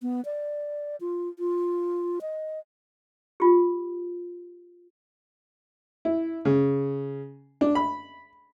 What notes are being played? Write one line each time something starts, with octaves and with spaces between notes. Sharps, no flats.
B3
D5
F4
F4
D#5
F4 G4
E4
C#3
D4
B5